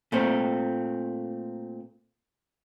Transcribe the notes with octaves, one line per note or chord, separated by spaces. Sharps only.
A#2 A3 C4